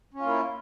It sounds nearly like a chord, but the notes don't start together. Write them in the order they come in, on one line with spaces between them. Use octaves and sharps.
C#4 F4 A#3 E4